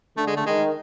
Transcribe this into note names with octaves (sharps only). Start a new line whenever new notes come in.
D3 A3
G#3
A3
D#3 G#3